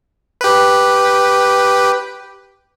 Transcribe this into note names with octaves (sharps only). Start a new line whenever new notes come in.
G4 B4